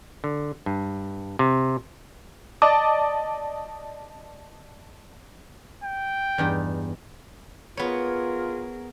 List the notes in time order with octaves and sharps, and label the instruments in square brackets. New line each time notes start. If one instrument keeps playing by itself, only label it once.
[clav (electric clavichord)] D3
G2
C3
[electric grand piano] D5 D#5 A5 D6 D#6
[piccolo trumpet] G5
[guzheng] E2 G2 D#4
[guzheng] B3 C#5 [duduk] F4 [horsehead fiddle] G#4 A#4